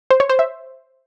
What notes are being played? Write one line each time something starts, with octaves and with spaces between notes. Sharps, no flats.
C5
C#5
C5
E5